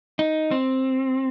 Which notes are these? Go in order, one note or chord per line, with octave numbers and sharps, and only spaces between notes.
D#4
C4